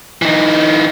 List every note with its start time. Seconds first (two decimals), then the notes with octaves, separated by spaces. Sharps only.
0.22 E3 D#4